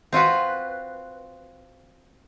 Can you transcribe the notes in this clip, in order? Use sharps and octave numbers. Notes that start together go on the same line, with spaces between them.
C4 F4 F#4 B4